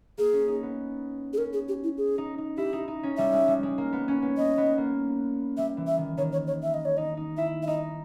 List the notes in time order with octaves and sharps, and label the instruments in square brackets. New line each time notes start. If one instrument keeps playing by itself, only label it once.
[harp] A#3 [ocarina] G#4
[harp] C#4
D#4
B3
[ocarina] G#4
[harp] C#4 [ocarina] A#4
[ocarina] G#4
G4
E4
G#4
[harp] D#4
D#4
[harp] E4 [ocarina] G4
[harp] D#4
D#4
C#4
[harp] G3 [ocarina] E5
[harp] G#3
G3
G#3
A#3
B3
C#4
B3
[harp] B3 [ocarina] D#5
[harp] B3
A#3
[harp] G3 [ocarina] E5
[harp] E3
[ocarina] E5
[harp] D#3
[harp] D#3 [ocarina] C#5
[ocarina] C#5
C#5
E5
D#5
C#5
[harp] D#4 [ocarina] D#5
[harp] D#4
[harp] E4 [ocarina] E5
[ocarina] E5
[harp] D#4 [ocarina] D#5